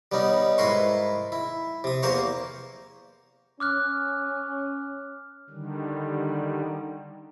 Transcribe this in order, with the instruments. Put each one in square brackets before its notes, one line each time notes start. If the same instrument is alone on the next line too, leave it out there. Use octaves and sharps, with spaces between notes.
[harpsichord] G3 B3 C#4 D#4
G#2 E4 A#4 B4 C6 C#6
E4
C3 D#6
E2 A#3 A#4 C5 F5 C#6
[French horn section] C#4 [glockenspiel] D6 F6 F#6
[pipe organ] D3 D#3 G3